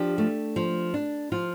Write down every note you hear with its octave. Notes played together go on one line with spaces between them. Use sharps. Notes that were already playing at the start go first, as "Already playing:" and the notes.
Already playing: F3 D4 G4
A3
F3
D4
F3 F4